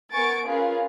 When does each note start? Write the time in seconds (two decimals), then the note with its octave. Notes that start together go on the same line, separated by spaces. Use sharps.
0.13 B3 A#4 G#5 C#6 A6 D7
0.47 C#4 F4 G#4 A#4 B4